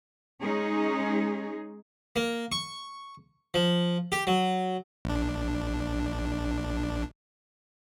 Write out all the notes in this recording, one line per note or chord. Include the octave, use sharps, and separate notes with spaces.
G#3 C#4 D#4 G#4
A#3
C#6
F3
G4
F#3
A#1 D4